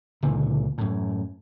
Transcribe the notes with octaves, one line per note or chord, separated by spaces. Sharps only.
C#2 A#2 D3 E3
F#2 A2